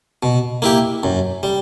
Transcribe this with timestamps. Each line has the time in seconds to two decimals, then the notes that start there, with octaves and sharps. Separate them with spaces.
0.23 B2
0.62 A#3 E4 G4
1.03 F#2
1.43 G3